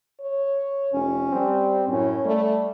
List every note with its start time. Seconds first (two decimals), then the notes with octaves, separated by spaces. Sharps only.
0.20 C#5
0.93 F1 C#4
1.32 G3 C4
1.88 F#2 A2 C#4
2.25 G3 A3